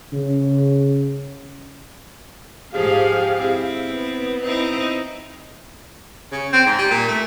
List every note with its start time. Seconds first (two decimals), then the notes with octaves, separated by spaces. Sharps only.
0.13 C#3
2.74 G#2 F3 G4 G#4 F5
3.35 C4 E4
3.87 B3
4.41 C4 D#4 E4
6.32 C#3
6.53 C4
6.66 G#2
6.78 G3
6.90 A#2
7.08 A3